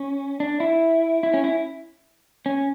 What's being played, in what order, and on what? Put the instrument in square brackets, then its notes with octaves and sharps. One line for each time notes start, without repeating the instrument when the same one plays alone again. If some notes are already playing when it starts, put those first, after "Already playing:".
Already playing: [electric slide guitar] C#4
D4
E4
E4
C#4
E4
C#4